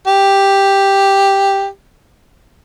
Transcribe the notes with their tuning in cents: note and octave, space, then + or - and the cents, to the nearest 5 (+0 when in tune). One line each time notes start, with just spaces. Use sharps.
G4 +5